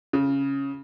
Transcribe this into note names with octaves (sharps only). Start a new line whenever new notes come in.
C#3